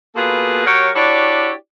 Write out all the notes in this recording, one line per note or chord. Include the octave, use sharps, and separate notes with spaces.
B2 A#3 F4 G#4 A4 B4
F#3 G4 A#4 C#5
D4 E4 F#4 G4 C#5 D5